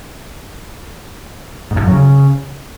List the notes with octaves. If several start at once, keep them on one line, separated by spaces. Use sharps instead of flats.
G#2
A2
F#2
F#3
C#3